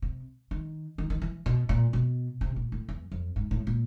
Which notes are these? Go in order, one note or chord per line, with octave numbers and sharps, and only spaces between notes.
C3
D#3
D#3
D#3
E3
B2
A#2
B2
C3
A#2
A2
E2
F2
G#2
A2
A#2